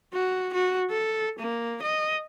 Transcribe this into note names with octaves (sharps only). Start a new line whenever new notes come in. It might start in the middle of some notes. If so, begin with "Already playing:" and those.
F#4
F#4
A4
A#3
D#5